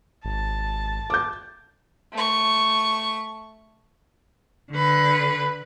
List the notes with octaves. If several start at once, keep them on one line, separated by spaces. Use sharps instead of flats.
G#1 A5
D6 G6
A3 C#6
D3 B4